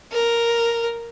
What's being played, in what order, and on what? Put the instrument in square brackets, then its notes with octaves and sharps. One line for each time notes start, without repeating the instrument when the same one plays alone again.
[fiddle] A#4